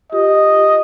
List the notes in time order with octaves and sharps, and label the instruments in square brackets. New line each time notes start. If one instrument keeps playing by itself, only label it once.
[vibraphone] F4 G4 [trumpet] D#5